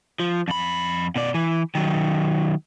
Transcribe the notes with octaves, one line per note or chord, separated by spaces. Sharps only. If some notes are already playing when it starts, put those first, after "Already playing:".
F3
F2 B5
B2 D5
E3
D#3 F#3